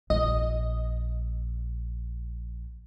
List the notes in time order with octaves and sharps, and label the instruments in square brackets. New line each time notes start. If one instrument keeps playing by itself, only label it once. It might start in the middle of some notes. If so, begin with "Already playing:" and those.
[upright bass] A#1 [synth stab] D#5